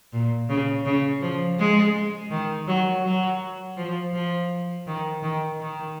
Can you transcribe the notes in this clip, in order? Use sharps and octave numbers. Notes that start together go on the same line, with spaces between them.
A#2
C#3
C#3
F3
G#3
D#3
F#3
F#3
F3
F3
D#3
D#3
D#3